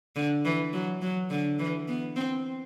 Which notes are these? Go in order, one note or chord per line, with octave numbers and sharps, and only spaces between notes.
D3
E3
F#3
F#3
D3
E3
B3
C4